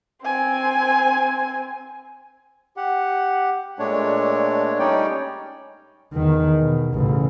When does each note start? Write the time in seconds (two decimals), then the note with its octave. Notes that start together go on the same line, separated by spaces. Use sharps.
0.23 C4 G#5
2.77 G4 F#5
3.79 A#2 G#3 A3 D4 C#5
4.79 G3 C#4 D#4 C#5 D5 G5
6.13 E2 D#3
6.60 B2
6.94 A1 C#3